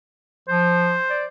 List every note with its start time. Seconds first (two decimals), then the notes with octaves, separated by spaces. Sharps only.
0.48 F3 C5
1.10 D5